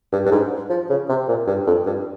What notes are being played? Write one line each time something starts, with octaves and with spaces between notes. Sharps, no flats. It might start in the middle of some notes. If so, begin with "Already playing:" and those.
G2
G2
G#2
F3
C#3
C3
A#2
G2
F2
G2